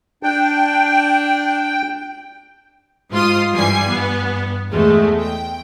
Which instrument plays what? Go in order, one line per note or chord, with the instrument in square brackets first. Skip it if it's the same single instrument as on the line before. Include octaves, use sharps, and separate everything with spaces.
[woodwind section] D4 [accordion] G5
[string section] G#2 F4 C6 D#6
G2 E3 G3 G#5 C7
G2 B3
E2 G#3 A3
G5